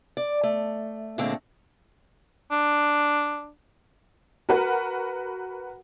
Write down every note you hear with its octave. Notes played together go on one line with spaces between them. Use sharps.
D5
A3
A#2 D3 G#3 A3 C4
D4
F#4 A#4 B4 F#5